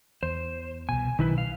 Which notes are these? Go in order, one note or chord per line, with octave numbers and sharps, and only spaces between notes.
E2 C5
C2 B2 G#5
B1 D#3 E4 B4
F5